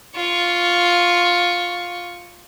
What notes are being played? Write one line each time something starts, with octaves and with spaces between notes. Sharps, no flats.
F4 C#6